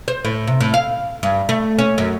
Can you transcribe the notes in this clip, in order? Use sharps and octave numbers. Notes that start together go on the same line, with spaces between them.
C5
A2
C3
A2
F5
G2
A3
C#4
F#2